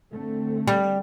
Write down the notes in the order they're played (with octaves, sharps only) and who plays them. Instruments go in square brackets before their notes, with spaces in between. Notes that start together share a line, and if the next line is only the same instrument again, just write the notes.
[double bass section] D3 A3 C4
[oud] G3